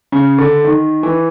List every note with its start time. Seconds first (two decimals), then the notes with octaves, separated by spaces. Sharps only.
0.12 C#3
0.38 D3
0.64 D#3
1.03 E3